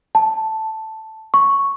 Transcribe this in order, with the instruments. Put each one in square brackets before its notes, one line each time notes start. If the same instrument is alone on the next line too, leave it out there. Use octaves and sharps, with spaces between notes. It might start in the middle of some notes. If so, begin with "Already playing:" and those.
[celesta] A5
C#6